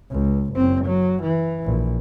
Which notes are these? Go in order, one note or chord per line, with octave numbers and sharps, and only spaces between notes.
C#2
F#1 C4
F#3
E3
A#1